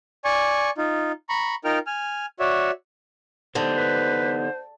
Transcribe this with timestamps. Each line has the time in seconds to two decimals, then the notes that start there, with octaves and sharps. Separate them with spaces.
0.25 D5 G#5 C#6
0.78 D#4 F4
1.29 A#5 B5 C#6
1.65 D#4 F4 A#4 G5 F6
1.87 G#5 F6
2.40 F#4 C#5 D5 E5
3.55 D3 B3 D#4 G4 C5
3.77 B4